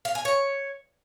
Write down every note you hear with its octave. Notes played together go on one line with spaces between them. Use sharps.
F5
G#5
C#5